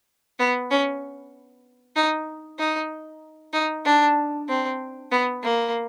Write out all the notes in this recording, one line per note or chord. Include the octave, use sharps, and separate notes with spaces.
B3
C#4
D#4
D#4
D#4
D4
C4
B3
A#3